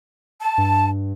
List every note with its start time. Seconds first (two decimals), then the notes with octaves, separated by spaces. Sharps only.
0.41 A5
0.58 G2